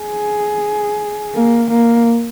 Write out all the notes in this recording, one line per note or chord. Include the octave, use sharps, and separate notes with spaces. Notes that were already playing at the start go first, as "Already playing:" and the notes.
Already playing: G#4
A#3
A#3